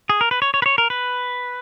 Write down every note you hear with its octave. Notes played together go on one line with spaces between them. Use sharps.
G#4
A#4
B4
C#5
C#5
B4
C#5
A#4
B4